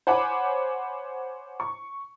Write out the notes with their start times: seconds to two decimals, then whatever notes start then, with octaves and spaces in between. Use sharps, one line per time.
0.07 C5 C#5 F#5 G#5 B5 D6
1.60 C#6